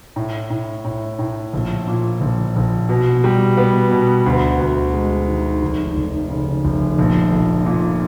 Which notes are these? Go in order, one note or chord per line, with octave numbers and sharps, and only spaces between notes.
A2
A2
A2
A2
A#1
A#2
A#1
A#1
B2
G3
B3
B2
D2
D2
G#3
D#3
F1
F1
C#3
F1
A#1
A#1
A#2